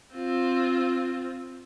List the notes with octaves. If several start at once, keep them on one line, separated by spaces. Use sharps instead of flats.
C4 F4